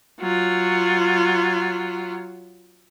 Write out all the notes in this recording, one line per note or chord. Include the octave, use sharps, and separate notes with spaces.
F#3 F4